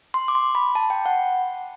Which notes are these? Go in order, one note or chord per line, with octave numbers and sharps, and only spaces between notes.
C6
D6
C6
B5
A5
G5
F#5